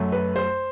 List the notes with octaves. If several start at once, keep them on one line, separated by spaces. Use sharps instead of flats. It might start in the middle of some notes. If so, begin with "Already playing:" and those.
Already playing: F#2 F#3 A3
B4
C5